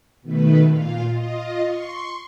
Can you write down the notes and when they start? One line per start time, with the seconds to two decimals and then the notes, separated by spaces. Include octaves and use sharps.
0.22 B2 D#3 A3 B4
0.67 A#2 F4 F5
1.09 F4 D#5
1.62 C6 C#6